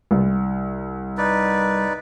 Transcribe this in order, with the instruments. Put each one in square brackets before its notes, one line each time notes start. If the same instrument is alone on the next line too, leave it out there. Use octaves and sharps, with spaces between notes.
[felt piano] C2
[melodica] D#4 B4 D5